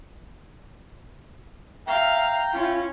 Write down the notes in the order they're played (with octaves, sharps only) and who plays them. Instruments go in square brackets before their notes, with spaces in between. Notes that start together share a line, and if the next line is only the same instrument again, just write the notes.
[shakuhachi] E5 [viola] F5 [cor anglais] G5 [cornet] A#5
[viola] C#4 [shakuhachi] E4 [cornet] F4